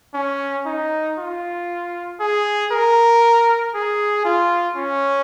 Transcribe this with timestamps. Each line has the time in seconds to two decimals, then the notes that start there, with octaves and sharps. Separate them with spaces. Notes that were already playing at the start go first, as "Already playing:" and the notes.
0.14 C#4
0.66 D#4
1.18 F4
2.20 G#4
2.72 A#4
3.75 G#4
4.25 F4
4.76 C#4